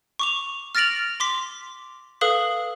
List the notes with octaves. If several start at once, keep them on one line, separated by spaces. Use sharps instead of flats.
C#6 D6 F7
F6 A6 A#6 D7 F7 F#7
C6 D6 B6
A4 B4 F5 D#6 F#7